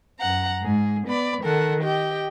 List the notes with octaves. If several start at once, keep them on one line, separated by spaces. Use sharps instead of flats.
F#2 F#5 A#5
G#2 G#4
B3 D5 B5
D#3 A4 A#4 F#5
G4 D#5 G5